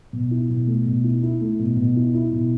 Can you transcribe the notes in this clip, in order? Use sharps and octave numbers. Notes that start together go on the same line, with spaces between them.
B2
E4
B2
A3
B2
E4
E4
A3
B2
B2
E4
E4
B2